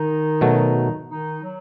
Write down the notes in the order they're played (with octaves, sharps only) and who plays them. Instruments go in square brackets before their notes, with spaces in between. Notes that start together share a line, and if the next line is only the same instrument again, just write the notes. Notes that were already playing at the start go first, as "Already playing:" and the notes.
Already playing: [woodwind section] D#3 D#4
[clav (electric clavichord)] B2 F#3 A3
[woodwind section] D#3 D#4
F#3